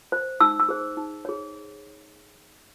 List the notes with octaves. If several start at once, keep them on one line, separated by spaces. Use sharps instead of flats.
C5
D#4 E6
E6
G#4 C5
D#4
G#4 C#5